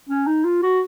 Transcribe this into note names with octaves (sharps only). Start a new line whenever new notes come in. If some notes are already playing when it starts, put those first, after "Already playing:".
C#4
D#4
F4
F#4